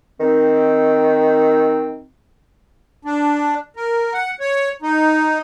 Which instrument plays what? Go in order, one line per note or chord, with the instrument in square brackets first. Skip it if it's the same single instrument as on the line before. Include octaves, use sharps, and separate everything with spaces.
[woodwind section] D#3 C4
[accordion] D4
A#4
F#5
C#5
D#4